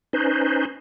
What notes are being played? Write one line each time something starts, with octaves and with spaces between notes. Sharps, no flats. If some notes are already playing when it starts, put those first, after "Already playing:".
C#4 D#4 B4 C5